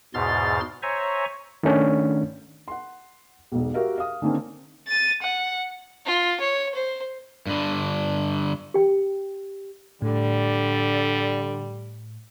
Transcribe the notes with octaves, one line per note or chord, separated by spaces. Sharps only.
E2 G#2 B2 C6 F6 A6
C5 C#5 E5 G#5 A#5 C#6
D#3 A3 C#4 D4
F#5 C6
E1 B1
F#4 G4 A#4 E5 F5
F5 D#6
D3 D#3 A#3 C4 C#4
A6 D#7
F#5
F4
C#5
C5
G2 D3
G4 G5
A2 D3 G3